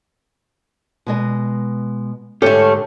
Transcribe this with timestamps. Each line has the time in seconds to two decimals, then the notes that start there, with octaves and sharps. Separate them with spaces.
1.06 B2 G#3 D#5
2.42 G#2 D3 A3 C#4 G4 A4